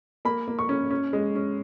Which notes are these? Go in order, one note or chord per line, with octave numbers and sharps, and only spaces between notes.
A#3 B5
A#3
C#6
C#4
C#4
G#3
C#4